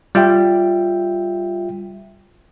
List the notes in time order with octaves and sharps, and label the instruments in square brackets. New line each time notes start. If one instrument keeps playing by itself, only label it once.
[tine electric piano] G3 F4 E5 G5